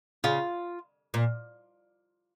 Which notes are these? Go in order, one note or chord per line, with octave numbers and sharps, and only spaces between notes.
C#3 F4
A#2